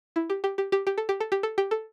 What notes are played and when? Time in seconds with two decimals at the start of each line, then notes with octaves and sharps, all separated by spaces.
0.16 E4
0.30 G4
0.44 G4
0.58 G4
0.72 G4
0.87 G4
0.98 A4
1.09 G4
1.20 A4
1.32 G4
1.43 A4
1.58 G4
1.71 A4